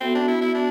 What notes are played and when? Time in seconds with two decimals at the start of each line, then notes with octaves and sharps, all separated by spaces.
0.01 B3 C4 F#4 A4 E5
0.15 D4
0.28 E4
0.41 E4
0.55 D4